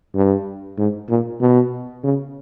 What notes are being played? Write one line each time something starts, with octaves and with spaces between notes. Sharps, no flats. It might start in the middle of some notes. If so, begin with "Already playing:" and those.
G2
G#2
A#2
B2
C#3